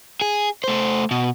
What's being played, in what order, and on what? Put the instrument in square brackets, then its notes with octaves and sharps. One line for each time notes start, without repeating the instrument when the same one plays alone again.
[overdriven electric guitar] G#4
A3 C5
B2